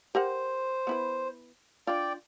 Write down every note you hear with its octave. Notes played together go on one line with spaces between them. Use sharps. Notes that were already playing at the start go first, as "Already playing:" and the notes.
G4 A#4 C5 F#5
B3 E4 B4
D4 F4 D5 G5